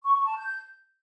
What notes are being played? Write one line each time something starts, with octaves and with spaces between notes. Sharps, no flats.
C#6
C#6
A5
G6